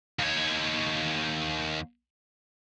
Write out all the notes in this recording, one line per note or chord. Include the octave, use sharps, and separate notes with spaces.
D#2 C#5